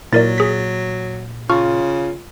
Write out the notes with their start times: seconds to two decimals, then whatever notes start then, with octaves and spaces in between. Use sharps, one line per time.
0.13 A#2 F#3 E4 A#4 D5 A6
0.38 G#4 B6
1.50 C#3 F4 A5 C#6 F6